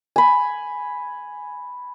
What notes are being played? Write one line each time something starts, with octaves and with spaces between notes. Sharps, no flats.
G#5 B5